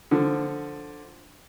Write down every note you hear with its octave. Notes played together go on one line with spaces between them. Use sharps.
D3 F3